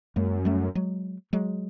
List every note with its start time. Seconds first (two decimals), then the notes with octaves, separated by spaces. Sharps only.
0.16 F#2 G#3 A#3
0.45 G3 A3
0.75 F#3 G#3
1.33 F#3 G#3